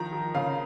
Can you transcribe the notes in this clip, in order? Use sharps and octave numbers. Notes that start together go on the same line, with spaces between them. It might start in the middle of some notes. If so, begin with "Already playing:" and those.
Already playing: D#3 F3 A#5
F3
C#3 F5